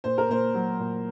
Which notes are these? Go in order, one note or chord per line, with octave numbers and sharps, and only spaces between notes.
A#2 C5
A#4
A#2 C5
F#3
A#2